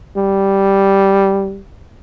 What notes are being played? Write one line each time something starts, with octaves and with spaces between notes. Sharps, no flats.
G3